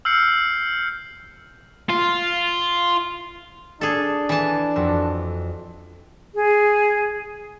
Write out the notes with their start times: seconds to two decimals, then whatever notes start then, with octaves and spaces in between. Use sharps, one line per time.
0.05 E6 F6 G6 C7 C#7
1.90 F4
3.81 D4 G#4 A4
4.29 E3 G#5 A5
4.76 F2 F#4 E6
6.35 G#4